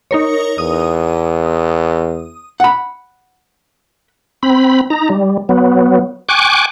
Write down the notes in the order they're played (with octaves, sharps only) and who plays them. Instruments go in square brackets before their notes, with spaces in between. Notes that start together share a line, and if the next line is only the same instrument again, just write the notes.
[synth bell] D#4 A#4 C#5
[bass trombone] E2 [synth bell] D#6
[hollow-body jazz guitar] F#5 B5
[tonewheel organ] C4 B5
D#4 A#5
G3
F#3 B3
G5 G#5 C#6 D6 F#6